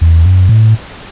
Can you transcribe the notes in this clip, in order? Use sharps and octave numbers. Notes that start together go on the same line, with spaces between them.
E2
F#2
A2